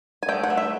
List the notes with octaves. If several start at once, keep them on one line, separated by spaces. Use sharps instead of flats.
G#5
A3 G5
F#5
A3
E5